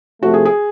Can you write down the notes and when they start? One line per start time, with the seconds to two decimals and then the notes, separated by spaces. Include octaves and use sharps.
0.23 C3 F3 A3 F#4
0.34 G#4
0.45 G#4